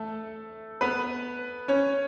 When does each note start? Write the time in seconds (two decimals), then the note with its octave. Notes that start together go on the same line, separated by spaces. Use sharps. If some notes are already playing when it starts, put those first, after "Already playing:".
Already playing: A3 A4
0.81 B3 B4
1.68 C#4 C#5